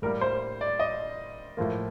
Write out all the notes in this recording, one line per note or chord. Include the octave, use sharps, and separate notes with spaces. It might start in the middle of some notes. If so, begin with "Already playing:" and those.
A2 G3 A#3 A#4
C5
D5
D#5
A2 F3 A#3